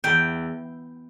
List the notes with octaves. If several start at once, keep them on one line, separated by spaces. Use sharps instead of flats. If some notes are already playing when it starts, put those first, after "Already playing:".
E2 G5